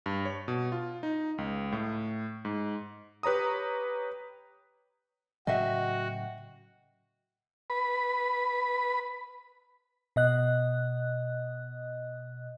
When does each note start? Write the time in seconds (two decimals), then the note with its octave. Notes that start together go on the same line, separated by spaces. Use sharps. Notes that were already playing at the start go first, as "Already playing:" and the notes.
0.06 G2
0.25 C#5
0.48 B2
0.72 F4
1.03 D#4
1.38 C#2
1.72 A2
2.45 G#2
3.23 G4 B4 C#5 A#5 D#6
5.47 A2 C#3 F#3 F#4 D#5 E5 F#5 G5
7.70 B4 B5
10.16 B2 D#5 F#6